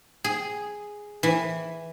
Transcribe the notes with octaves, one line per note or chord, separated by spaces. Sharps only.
G#4
E3